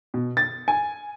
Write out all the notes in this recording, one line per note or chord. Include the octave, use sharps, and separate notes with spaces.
B2
A6
G#5